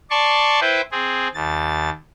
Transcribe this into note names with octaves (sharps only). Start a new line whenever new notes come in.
D5 A5 C6 C#6
E4 B4 C5 G5
C4 G#4
D#2 A6